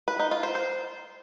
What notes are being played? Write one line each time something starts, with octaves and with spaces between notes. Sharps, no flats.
B4
D#4
F4
C5
C5